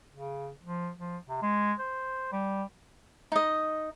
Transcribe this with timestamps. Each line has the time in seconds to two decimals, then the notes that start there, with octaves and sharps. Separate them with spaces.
0.13 C#3
0.63 F3
0.98 F3
1.29 C3
1.42 G#3
1.79 C5
2.32 G3
3.32 D#4 D#5